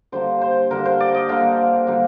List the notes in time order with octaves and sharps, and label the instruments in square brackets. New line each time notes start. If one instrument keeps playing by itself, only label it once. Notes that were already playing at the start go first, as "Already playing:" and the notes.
[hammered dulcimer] D3 G3 A#3 C5
C5
D3 G3 A#3 A#4
C5
D5
D#5
D3 G3 A#3 F5
D3 G3 A#3